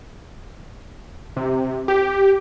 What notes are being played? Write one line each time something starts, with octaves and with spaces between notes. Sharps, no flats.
C3
G4